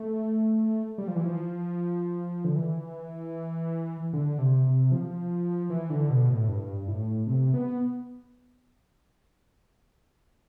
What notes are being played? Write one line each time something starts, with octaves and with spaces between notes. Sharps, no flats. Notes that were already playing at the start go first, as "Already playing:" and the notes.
Already playing: A3
G3
F3
E3
F3
D3
E3
D3
C3
C3
F3
E3
D3
B2
A2
G2
A2
C3
B3